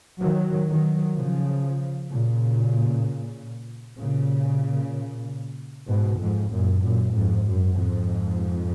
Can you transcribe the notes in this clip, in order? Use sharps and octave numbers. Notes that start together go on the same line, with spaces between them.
D#3 F#3
D#3 F#3
C#3 F3
A#2 C#3
A#2 C#3
G#2 B2
F2 G#2
F#2 A#2
F#2 A#2
F2 G#2
F#2
F2 G#2